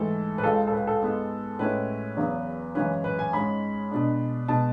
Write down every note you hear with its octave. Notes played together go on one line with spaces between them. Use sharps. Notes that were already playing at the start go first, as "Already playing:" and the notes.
Already playing: G#2 E3 A3 E4 A4
B4
C#2 C#3 G#3 A4
A4
B4
A4
G#2 G#3 B3
A2 G#3 C#4 E4 B4
E2 C#3 F#3 B3
F#2 C#3 E3 G#3 C#4 B4
B4
G#5
G#2 G#3 C#4 B5
B2 G#3 D4
B2 G#3 A5